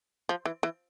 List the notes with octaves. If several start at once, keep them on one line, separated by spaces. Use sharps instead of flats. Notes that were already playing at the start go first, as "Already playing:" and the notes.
F3
E3
E3